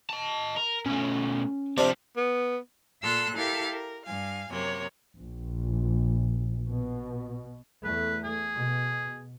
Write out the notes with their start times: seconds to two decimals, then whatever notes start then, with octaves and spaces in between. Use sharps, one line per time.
0.10 D#5 A5
0.57 A#4
0.86 B2 A3 C#4
1.78 C3 F3 G3 C4 D4
2.17 B3
3.02 A#2 A4 F5 C6 E6 F#6
3.35 E4 G4 A4 A#4 F5
3.72 A#4
4.05 G2 F5 G#5
4.50 F#2 C3 A#3 C#5
5.18 A#1
6.68 B2
7.84 E2 A3 B4
8.24 G#4
8.54 B2